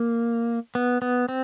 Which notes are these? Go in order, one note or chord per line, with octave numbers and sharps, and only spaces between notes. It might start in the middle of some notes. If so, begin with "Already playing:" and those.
Already playing: A#3
B3
B3
C4